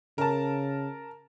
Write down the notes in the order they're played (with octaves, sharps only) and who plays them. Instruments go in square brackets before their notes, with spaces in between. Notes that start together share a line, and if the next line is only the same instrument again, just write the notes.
[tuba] C#3 [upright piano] A#4 A5